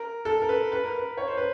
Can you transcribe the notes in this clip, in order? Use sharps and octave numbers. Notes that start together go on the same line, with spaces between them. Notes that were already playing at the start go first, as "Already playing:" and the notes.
Already playing: A#4
A4
A#4
B4
B4
A#4
B4
C#5
C5
B4